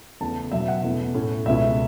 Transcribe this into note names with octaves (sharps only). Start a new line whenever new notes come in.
E2 C#3 A3 A5
E2 B2 F#3 E5
F#5
E2 B2 A3 C#4 E4
A2 A3 C#4
C#2 B2 A3 C#4 E4 E5